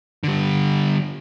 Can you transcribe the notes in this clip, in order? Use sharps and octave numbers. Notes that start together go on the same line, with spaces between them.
D3 G3